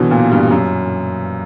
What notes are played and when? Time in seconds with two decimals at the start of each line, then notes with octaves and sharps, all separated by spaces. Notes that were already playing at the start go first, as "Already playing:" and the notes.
Already playing: B2 D3 E3 F#3
0.11 A#2
0.31 G2
0.51 F#2